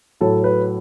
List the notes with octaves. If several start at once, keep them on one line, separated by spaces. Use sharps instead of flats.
A2 F#3 A3 A4
B4